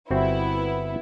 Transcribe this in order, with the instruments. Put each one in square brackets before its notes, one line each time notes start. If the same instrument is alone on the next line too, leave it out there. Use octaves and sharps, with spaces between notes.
[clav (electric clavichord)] G1 C4 F#4 [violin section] B3 E4